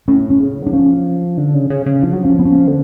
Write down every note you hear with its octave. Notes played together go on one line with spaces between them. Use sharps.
A2 C#4
C#4
C#3
F#3 D4
F3 C#4
D3
C#3
C#3
C#3
F3 D4
F#3
F3 C#4
B3
C#4
D3